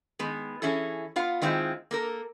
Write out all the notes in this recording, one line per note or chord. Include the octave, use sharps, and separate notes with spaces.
D#3 G#3 B3
E3 C#4 E4 G#4 A4
B3 F4 F5
D#3 G#3 C4 E4 F4
A#3 A4 A#4